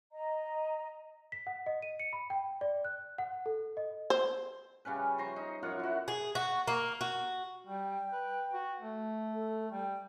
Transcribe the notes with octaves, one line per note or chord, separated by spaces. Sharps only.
D#5 A#5
B6
F#5
D#5
D#7
C#7
B5
G5
D5
F#6
F#5
A4
D#5
C5
C#3 G3 C#4 B4
C5 A#5 C6 C#6
D#4
F#2 F4 C#5 F#5
E4 F#4
G#4
F#4
A#3
F#4
G3 G5
B4
F#4
A3
A4
G3 G5